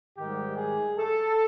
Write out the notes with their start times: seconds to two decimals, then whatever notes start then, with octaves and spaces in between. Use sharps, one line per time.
0.17 G#2 D#3 G3 G4
0.57 G#4
0.97 A4